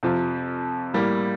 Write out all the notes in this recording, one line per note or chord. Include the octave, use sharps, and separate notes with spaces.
F2 C3 F3
A2 G3 A#3